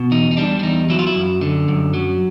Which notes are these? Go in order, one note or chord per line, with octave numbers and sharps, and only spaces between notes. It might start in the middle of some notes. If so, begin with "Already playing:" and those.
Already playing: B2
E2 D#4
D#4
G3 D4
D4
E2 D#4
F#3 E4
F4
E4
F#2
D3
F#2
F#3